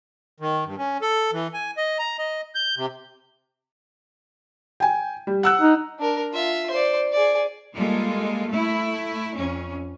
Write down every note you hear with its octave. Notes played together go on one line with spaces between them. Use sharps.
D#3
G2
C#4
A4
E3
G#5
D#5
A#5
D#5
G6
C3
G5 G#5
G3
F#5 E6 F#6
D#4
D4 A#4
F4 E5
C5 D5
G#4 D5
G3 G#3 A#3 F4 A4
A3 E4
F2 C#4